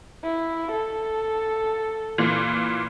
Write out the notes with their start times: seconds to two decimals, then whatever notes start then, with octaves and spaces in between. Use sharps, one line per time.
0.24 E4
0.72 A4
2.18 A#2 E3